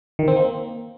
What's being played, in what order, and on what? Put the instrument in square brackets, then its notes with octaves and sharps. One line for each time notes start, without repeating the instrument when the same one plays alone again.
[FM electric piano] D#3
C4
A#3